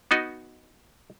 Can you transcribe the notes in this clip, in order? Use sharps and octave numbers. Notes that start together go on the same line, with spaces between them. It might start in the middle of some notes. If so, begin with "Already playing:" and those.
B3 D#4 F#4 D#5